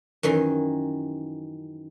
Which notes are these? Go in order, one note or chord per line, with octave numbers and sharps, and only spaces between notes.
F#2 D#3 E3 C6